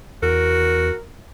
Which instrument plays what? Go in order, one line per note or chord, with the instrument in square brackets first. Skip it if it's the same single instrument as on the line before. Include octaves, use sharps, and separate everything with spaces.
[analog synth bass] E2 [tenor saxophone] F#4 [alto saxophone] A#4